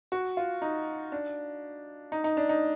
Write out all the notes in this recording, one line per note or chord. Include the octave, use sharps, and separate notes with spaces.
F#4
F4
D#4
D4
D#4
D#4
D4
D#4